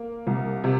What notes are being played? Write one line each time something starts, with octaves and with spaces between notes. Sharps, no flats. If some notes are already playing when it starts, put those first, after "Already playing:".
Already playing: A#3
C2
C3